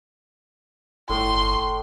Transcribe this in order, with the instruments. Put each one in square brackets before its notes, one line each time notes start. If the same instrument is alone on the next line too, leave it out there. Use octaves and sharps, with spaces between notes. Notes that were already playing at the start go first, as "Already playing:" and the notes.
[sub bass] G1 [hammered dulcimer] A2 [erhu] C6